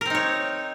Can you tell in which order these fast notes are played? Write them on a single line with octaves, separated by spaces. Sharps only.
A#4 C4 D#4 C#5